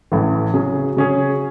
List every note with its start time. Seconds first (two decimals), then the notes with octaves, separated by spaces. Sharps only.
0.12 A1 A2 E3
0.54 C#3 F#3 C#4 G#4
0.97 C#3 F#3 C#4 G#4